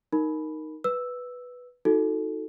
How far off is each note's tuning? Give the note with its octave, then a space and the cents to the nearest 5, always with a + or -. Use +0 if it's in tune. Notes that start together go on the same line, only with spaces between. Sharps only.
D#4 +0 A#4 +0 B5 +0
B4 +0 E6 +0
D#4 +20 F#4 -20 A4 +0